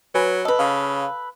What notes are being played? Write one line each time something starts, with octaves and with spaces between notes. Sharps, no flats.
F#3 B4 G#5 B5
A4 B4 D#5
C#3 F5